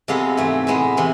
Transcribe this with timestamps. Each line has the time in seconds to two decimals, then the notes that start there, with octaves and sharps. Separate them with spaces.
0.08 C3 G#3 B3 F4 A4
0.37 G#2 E3 A3
0.67 A2 G#3 B3
0.97 C3 E3